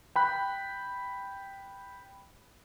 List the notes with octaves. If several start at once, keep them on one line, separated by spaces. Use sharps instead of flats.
G5 B5 F#6